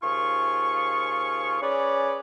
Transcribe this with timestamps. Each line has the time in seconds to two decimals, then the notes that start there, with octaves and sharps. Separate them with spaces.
0.03 D#2 F3 F4 G#4 C#6
1.62 C#4 G#4 B4 C#5 D5